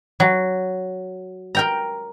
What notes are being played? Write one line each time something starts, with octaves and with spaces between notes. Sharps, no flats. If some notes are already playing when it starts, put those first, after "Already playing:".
F#3
A#4 G5 A#5